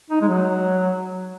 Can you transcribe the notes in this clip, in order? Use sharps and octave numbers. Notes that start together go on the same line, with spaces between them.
D#4
G#3
F#3